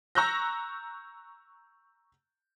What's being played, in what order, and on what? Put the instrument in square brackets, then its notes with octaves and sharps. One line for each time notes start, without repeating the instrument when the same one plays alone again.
[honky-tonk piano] A#5 C#6 E6 F#6 G6 A#6